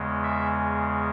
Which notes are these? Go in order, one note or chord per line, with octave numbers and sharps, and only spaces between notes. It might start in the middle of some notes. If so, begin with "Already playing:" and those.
Already playing: E2 C#3 G#3
E5